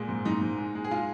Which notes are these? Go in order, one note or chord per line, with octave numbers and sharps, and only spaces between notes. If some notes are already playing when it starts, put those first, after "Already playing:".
Already playing: A#2 G#3
G#2
G#2 D#4
G#2
G#3
G#3
G#4
G#3 F4